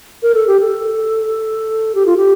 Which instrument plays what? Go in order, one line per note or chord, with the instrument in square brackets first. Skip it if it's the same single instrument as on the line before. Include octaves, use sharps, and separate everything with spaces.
[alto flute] A#4
A4
G4
A4
G4
F4
G4